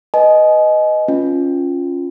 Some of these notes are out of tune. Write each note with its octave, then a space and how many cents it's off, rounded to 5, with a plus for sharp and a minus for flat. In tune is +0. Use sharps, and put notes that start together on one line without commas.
B4 +0 D#5 +0 G#5 +35
C#4 +0 F4 +0